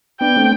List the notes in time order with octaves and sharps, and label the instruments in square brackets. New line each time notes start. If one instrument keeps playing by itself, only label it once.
[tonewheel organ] B3 D4 [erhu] G5
[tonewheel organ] A3 C4